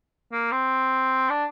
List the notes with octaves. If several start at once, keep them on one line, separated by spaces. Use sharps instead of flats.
A#3
C4
D4